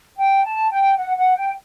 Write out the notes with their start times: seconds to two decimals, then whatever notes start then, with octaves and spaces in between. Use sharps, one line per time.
0.17 G5
0.44 A5
0.70 G5
0.97 F#5
1.17 F#5
1.36 G5